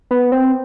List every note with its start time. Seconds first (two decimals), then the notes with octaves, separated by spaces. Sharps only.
0.11 B3
0.32 C4